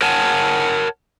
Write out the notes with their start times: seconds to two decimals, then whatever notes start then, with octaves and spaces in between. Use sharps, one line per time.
0.01 A#4 C#5 F#5 G#5 A5